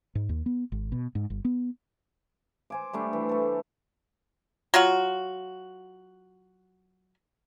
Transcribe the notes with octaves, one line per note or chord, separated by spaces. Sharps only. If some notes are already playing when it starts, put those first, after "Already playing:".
G#2
D#2
B3
G#1
B2
G#2
G1
B3
C5 G#5 D6
G3 A3 D4
E3
A3 A4
F#3 F4 F#4